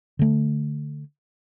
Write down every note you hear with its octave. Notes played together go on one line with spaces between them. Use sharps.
D3 A3